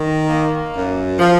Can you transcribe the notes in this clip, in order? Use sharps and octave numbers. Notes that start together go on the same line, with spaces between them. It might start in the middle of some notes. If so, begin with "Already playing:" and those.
Already playing: D#3
A#3
F#2
F3